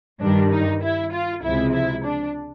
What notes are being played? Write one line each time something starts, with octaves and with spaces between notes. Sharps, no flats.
G2 D#3 G3 D4
D#4
E4
F4
C#2 C3 F3 G#3 E4
E4
D4